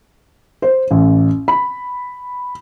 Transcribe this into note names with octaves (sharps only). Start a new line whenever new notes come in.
C5
A1
B5